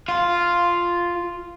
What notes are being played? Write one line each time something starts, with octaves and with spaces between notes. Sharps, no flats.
F4